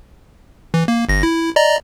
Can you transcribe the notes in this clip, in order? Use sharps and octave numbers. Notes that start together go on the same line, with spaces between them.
E3
A#3
G1 A#6
E4
D5 D#5 A#5